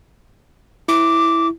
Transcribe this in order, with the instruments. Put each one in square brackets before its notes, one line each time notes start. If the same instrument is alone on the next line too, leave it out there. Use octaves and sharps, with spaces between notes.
[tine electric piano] E4 [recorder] D6